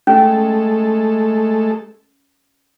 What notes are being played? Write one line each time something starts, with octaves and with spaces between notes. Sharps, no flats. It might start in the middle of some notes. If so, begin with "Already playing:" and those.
G#3 A3 C#4 A4